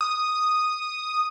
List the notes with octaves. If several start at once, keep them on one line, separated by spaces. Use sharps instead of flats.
D#6